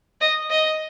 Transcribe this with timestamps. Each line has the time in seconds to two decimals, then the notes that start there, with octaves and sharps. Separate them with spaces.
0.21 D#5
0.50 D#5